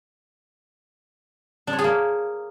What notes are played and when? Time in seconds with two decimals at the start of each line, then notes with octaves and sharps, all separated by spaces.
1.67 D4
1.73 C#5
1.79 G#4
1.84 A#3